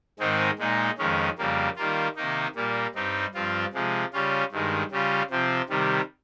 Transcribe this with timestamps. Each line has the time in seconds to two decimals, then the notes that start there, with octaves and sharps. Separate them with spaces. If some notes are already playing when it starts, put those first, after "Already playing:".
0.19 G#2 D#3 G#3 C4 D#4
0.59 A#2 G#3 D#4
0.98 F2 D#3 G#3 C#4
1.38 F2 C#3 G3 A#3
1.76 D#3 G3 A#3 F4
2.15 C3 D#3 A#3 D#4
2.55 A#2 G3 A#3
2.95 G2 G3 C4 D#4
3.34 G2 F3 C4 F4
3.73 C3 F3 G#3
4.13 C#3 G3 C#4 F4
4.52 G2 D#3 G#3
4.91 C#3 G3 C#4 F4
5.30 C3 F3 C4
5.69 C3 D#3 G3